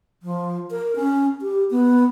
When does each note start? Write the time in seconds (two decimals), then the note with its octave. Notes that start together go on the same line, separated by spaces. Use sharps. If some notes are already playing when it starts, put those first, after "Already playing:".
0.23 F3
0.71 A#4
0.96 C#4
1.42 G4
1.71 B3